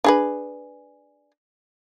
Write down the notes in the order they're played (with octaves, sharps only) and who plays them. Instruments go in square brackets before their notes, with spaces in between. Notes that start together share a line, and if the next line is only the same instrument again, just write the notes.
[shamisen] D4 G#4 B4